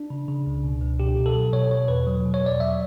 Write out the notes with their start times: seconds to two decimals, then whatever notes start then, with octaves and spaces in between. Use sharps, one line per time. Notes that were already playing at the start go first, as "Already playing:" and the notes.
Already playing: D4
0.10 C#3
0.28 C#3
0.47 C#2
0.63 B2
0.81 C#2
1.00 B2 G4
1.17 B2
1.26 A4
1.36 F#3
1.53 B2 C#5
1.71 B2 C#5
1.88 E2 B4
2.07 F#3
2.25 B2
2.34 C#5
2.42 E2 D5
2.60 F#3 E5